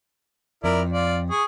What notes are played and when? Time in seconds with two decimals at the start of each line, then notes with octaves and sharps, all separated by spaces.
0.64 F2 E4 A#4 D5
0.92 F4 D5
1.31 G#4 C#6